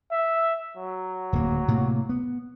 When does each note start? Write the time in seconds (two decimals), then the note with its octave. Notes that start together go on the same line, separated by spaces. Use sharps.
0.12 E5
0.77 F#3
1.33 D1 A#3
1.68 A2 C3 A#3
2.09 B3